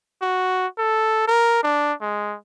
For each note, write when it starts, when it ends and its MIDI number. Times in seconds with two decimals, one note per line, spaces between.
0.22 0.67 66
0.79 1.25 69
1.28 1.62 70
1.64 1.93 62
2.02 2.36 56